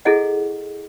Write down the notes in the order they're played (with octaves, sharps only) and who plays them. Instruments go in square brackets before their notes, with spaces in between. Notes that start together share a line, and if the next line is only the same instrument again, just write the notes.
[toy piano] E4 G#4 A4 D#5 F#5